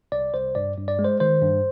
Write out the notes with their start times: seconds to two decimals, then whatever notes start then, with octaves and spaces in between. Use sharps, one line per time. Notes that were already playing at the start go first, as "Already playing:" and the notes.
0.12 C2 D5
0.33 C2 C5
0.55 G2 D5
0.77 G2
0.88 D5
0.99 G#3
1.04 C5
1.20 D#3 C5
1.42 G2